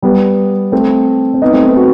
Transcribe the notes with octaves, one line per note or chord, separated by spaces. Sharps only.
G3 B3
A3 C4
C4
B3 D#4
A3 C4
B3 D#4
D#4 F#4